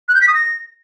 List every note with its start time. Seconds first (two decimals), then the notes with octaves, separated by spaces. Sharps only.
0.08 F#6
0.15 G6
0.21 B6
0.28 D#6
0.34 A#6